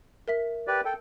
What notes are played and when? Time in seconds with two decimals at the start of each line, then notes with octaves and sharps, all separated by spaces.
0.28 A#4 E5 B6
0.67 G4 B4 D5
0.85 A4 G5